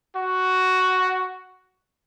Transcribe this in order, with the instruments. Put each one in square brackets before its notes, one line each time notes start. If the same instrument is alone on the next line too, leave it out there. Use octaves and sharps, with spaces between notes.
[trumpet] F#4